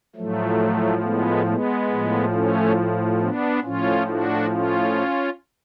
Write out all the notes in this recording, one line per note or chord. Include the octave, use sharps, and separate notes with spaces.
A2 F3 F#3 A3
G#3 B3
G#3 B3
A2 F3
A3 C#4
B3 D4
A2 F3 C#4 F4
D4 F#4
C#4 F4